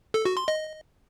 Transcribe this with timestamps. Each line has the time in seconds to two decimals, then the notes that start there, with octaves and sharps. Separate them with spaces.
0.14 A4
0.25 F#4
0.37 C6
0.48 D#5